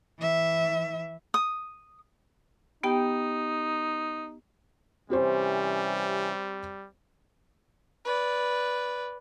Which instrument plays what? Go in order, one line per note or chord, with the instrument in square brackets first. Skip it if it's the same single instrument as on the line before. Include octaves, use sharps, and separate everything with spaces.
[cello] E3 E5
[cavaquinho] D#6
[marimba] B3 G4 G5 [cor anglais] D#4
[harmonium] C3 E3 C#4 [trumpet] G3 [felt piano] C4 G4 C5
[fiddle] B4 D5